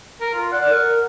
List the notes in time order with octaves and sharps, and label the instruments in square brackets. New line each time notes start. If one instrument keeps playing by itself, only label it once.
[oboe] A#4
F4
[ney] D5 [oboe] F#5
[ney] A#4